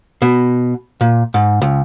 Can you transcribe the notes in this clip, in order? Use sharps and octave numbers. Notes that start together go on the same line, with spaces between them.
B2
A#2
G#2
C#2